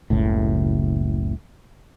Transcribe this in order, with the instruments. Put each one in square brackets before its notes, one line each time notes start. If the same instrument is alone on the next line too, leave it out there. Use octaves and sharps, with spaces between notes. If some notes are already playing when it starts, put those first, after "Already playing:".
[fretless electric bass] F#1 C#2 A2